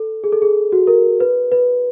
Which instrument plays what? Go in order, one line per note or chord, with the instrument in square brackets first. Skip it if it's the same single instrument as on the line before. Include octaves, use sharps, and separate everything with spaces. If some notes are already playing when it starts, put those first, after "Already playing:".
Already playing: [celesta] A4
G#4
A4
G#4
F#4
A#4
B4
B4